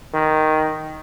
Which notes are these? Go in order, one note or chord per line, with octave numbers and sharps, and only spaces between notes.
D#3